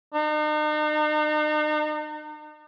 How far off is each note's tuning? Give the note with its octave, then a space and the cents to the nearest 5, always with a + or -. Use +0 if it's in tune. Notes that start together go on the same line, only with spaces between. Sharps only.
D#4 -40